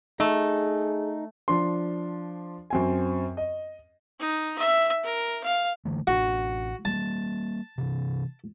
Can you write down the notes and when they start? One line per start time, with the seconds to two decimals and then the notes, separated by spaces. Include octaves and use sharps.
0.20 A3 D#4 G#4
1.48 F3 D4 C6
2.70 F#2 C4 G#5
3.37 D#5
4.20 D#4
4.59 E5
5.04 A#4
5.44 F5
5.85 D3 E3 A3
6.07 A1 D4 F#4
6.85 G3 A#3 A5
7.78 C3 E3